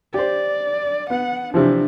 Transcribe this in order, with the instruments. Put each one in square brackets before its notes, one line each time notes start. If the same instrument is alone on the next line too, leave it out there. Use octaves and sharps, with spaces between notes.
[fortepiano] G4 C5 [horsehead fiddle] D5
[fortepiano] B3 [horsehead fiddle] F#5
[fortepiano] C3 E3 F3 [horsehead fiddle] D4